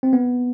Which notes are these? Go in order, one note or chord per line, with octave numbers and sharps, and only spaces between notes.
C4
B3